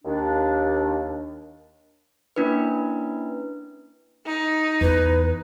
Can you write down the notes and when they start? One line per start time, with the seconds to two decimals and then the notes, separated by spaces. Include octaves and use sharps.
0.04 D#2 D4
2.36 A#3 C#4 D4 E4 B4
4.26 D#4
4.81 E2 B4